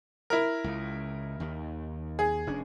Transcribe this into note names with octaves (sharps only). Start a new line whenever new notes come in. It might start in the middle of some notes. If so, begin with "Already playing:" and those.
E4 A#4
C#2 C#3
D#2 D#3
G#4
F1 C#4 D4